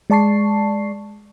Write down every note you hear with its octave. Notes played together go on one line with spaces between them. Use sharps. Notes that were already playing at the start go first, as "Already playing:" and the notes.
G#3 D5 A5 C#6 C7